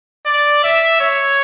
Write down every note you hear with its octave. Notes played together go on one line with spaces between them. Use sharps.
D5
E5
C#5